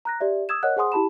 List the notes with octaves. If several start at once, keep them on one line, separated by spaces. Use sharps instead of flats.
A#5 F#6 A#6
G4 D5 E5
D#6 E6 G#6 E7
A#4 C#5 D#5 F#5 F#6
G#4 C5 F#5 G#5 C6 D#6
E4 G4 A5 B5 E7